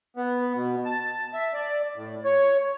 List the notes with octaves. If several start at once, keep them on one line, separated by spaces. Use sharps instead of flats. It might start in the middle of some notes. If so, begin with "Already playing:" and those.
B3
B2
A5
E5
D5
A2
C#5